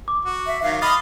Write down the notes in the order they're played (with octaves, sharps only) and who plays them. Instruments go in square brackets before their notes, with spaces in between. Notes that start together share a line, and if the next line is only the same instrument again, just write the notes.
[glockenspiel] D6
[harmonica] F#4
[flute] E5
[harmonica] D#3 F#3 [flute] F5
[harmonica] D#5 F5 D#6 [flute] B5 [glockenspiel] A6